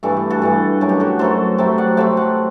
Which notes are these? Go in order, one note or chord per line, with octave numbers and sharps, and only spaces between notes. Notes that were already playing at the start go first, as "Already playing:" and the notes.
G2 E3 A3 A4
G4
F#4 A4
G2 E3 A3
F#2 F#3 A3
G4
F#4 A4
F#2 F#3 A3 A4 C5
C3 F#3 A3 C5 E5
D5 F#5
C3 F#3 A3 E5 G5
F#5 A5